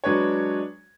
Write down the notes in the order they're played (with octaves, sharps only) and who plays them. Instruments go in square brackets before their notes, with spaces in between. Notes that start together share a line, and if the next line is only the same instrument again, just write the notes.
[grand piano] F#3 G#3 D4 B4 C#5